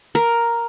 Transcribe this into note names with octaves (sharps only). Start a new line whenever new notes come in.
A#4